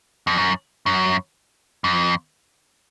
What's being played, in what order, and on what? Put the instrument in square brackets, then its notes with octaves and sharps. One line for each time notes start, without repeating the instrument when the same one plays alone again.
[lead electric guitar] F2
F#2
F#2
F2